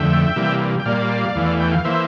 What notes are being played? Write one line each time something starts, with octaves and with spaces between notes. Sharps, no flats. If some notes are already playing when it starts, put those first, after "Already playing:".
Already playing: F2 D3 A3 E5 G5
C3 E3 G3 A#3
G5
A#2 G3 A#3 D5 F5
E2 E3 A3
G5
F5
E3 A#3 C5 E5